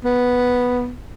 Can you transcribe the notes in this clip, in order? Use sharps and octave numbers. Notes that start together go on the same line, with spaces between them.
B3